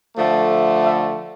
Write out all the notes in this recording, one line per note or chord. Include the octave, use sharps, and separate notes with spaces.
D3 F3 A3
E5